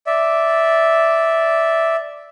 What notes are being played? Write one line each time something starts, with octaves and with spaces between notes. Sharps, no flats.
D5 E5